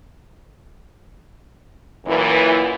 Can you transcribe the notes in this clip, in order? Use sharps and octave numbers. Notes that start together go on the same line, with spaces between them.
F#2 A#2 E3